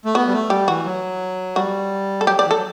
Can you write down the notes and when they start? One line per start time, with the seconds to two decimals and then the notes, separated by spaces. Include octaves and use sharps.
0.05 A3
0.15 B3 F#4
0.27 G3
0.33 A3
0.50 G3 G4
0.68 E3 F#4
0.85 F#3
1.56 G3 F#4
2.21 A4
2.27 F#3 G4
2.39 F#3 D5
2.46 E3
2.50 F#3 A4